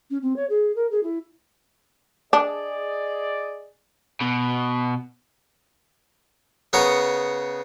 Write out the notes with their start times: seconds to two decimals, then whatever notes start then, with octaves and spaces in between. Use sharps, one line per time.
0.10 C#4
0.22 C4
0.36 C#5
0.49 G#4
0.76 A#4
0.91 G#4
1.03 E4
2.33 D4 G#4 D5 D#5
4.22 B2
6.73 C#3 B3 A#4 C#5 D#6